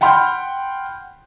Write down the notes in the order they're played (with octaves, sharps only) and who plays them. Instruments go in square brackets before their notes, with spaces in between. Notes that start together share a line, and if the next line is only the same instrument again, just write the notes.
[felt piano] F#5 G5 B5 C6 F6 G6